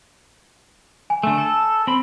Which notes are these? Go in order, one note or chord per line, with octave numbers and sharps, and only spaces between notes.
G#5
D3 A3
A4
C4 B5